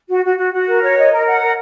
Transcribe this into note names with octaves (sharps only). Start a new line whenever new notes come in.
F#4
F#4
F#4
F#4
A#4
C#5
D#5
A#4
F#5
A#4